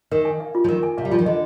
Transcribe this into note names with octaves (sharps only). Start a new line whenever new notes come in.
D#3 A#4
G#5
F5
F4
F3
D#3 A#4
G#5
C3 F5
G3
F3 F4
D#3
D3 D#5